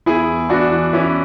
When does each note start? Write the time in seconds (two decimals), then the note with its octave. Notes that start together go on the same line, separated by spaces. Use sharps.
0.06 E2 E4 G#4
0.28 E2
0.49 E2 D4 F#4
0.71 E3
0.93 E3 C#4 E4